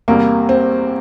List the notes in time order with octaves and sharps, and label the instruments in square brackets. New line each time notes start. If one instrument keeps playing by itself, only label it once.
[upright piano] E2 C3 G3 [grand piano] A#3
[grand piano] C4